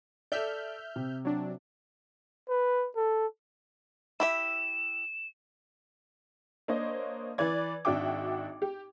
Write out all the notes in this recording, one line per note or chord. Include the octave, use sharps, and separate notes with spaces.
A4 D5 E5 F6 G6
C3
F#3 D4
B4
A4
E4 G4 E5 E7
A#3 D4 C5 C#5 D#5
E3 B4 D5 G#6
G#1 D4 F#4 E5 G5 D6
G4